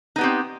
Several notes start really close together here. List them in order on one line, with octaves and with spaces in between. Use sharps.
D#4 B3 G4 C4